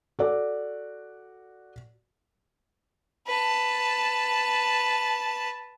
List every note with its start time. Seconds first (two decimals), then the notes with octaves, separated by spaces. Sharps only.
0.19 F#4 A4 D5
3.27 B4 A5